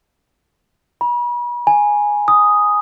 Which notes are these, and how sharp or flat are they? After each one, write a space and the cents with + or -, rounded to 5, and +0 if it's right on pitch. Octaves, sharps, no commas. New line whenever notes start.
B5 -40
G#5 +0
D#6 +0